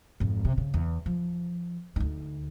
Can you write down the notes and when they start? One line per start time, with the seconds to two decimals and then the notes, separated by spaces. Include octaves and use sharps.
0.20 G#1 F2
0.45 C3
0.57 C#3
0.74 E2
1.06 F3
1.96 D2 D#4